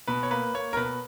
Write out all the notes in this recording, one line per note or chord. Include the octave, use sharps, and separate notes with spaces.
B2 B4
C#5
A#3 B4
A#3 C#5
A#4
B2 B4